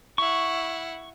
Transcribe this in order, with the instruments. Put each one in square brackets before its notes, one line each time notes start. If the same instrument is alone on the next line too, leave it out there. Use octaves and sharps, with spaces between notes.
[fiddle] E4 F#5 [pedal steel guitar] C#6